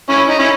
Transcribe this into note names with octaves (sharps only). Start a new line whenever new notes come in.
C#4 E4
D#4
C#4 E4